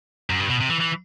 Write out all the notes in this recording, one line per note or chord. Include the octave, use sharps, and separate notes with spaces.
F#2
G2
B2
C3
E3
E3